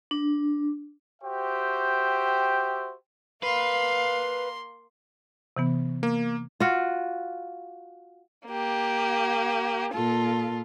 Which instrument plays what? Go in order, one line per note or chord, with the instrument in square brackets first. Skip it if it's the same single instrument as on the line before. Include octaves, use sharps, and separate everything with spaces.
[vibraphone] D4
[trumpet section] F#4 G4 C5 E5 G5
[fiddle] A#3 C6 [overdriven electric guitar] B4 [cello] F5
[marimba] C3 E3 B3
[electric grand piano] A#3
[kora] F4 F#4
[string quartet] A#3 G4
A#2 F4 A4